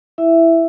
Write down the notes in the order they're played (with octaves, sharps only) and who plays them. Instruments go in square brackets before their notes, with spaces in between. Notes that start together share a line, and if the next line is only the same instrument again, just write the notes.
[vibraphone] E4 E5